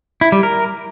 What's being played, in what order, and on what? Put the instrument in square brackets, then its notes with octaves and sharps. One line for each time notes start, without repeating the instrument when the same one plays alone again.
[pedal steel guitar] E4
G3
A#4